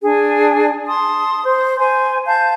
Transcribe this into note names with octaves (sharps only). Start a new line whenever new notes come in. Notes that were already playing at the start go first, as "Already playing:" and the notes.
D4 G#4
A5 C6 D#6
C5
C5 G#5
F5 A5 G6